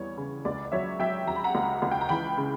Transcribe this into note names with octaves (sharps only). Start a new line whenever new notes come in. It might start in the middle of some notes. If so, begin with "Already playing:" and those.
Already playing: E2 G3 C#5
C#3
C#2 D5
D5
F#3 C#5 E5
F#3 E5 G5
F#3 A#5
B5
F#5 A#5
C#2
C#2
G5
A#5
E3 G5 B5
C#3